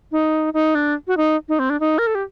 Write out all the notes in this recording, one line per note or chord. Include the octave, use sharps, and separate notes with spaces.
D#4
D#4
D4
F#4
D#4
D#4
C4
D4
D#4
A#4
A4
G4